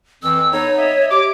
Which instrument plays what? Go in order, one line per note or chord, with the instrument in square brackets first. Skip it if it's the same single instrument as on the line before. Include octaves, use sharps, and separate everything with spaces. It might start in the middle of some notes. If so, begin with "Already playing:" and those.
[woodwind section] F2 E3 [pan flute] E6
[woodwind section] B3 D#4 A4 [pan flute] C#5
[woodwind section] D#5 E5
[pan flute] G4 [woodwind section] D6